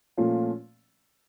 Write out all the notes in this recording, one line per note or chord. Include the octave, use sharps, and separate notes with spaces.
A#2 F3 A3 C#4 F4